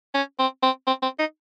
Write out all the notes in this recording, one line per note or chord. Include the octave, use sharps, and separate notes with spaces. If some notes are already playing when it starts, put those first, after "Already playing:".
C#4
C4
C4
C4
C4
D#4